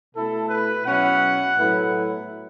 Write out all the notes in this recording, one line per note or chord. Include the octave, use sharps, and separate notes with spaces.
B2 A3 E4 A4
B4
B2 F#3 C#4 E4 F#5
A2 F#3 B3 E4